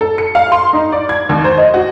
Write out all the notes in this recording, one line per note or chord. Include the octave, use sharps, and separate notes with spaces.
A4
C#7
F5
C6
D#4
D5
G#6
D#2
C5
D#5
F#4